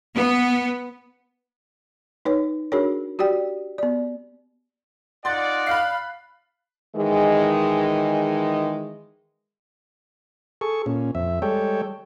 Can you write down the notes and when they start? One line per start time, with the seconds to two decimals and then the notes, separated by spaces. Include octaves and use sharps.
0.15 B3
2.25 D#4 B4 C#5
2.72 D4 F#4 G#4 A#4 C#5
3.19 F#4 G4 D5 G5
3.78 B3 D5
5.25 D#4 F4 D5 F#5 C6 A6
5.67 F5 B5 F#6 C7
6.95 D#3 E3 G#3
10.61 G#4 A4 C#6
10.86 A#2 C#4
11.15 F2 E5
11.42 G3 G#3 A4 C#5 G5